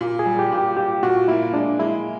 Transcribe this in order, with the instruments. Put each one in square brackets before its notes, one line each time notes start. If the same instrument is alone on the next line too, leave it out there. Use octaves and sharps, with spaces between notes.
[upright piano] A#2
[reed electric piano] G#4
[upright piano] G3
[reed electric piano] G4
[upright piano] A#2
[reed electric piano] G4
[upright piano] A#2 [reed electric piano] G4
[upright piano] A#2 [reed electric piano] F#4
[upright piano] A#3 [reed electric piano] E4
[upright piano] G#3 [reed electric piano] D4
[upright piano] G#3 [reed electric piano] E4